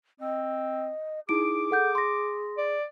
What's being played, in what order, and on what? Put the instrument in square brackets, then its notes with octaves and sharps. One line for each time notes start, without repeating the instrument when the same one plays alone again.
[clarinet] C4 [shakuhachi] D#5
[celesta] D#4 E4 D7 [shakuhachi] G#4 [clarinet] D6
[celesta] A4 F#5 G6
C6 A#6
[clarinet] D5